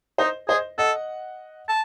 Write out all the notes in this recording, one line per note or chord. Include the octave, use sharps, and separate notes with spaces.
D#4 C5 D#5
G#4 C5 D#5
A4 D#5 F#5
A5